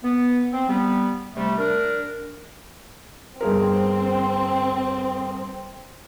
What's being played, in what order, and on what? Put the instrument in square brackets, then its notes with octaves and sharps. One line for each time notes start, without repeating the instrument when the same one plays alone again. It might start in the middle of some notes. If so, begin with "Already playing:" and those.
[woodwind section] B3
C4
G3 B3
C3 G3 A3
D4 A#4
[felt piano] G1 G#4 A#4 [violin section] C4